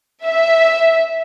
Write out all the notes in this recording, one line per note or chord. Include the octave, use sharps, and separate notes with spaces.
E5